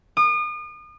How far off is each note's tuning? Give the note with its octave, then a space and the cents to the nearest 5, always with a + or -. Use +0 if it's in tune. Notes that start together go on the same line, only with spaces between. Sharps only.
D#6 -40